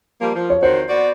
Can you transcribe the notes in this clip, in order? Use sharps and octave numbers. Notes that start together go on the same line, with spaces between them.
F3 G3 A#3
F3
C#5
D#3 C4 F#4 C5
B3 F#4 D5